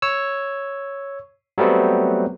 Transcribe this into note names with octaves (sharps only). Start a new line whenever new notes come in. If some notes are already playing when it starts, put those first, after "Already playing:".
C#5 E6
F#3 G3 A3 B3 C4